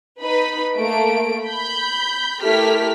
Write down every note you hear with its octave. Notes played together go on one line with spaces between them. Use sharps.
D#4 B4 B5
A3 A#3 D7
B5 G6
A3 E4 G4 A#4 F6 B6